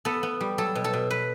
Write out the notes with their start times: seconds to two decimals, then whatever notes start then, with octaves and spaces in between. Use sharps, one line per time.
0.05 B3 A4
0.23 B3
0.41 G3
0.58 F#3 A4
0.75 B2
0.84 A4
0.93 B2
1.11 B4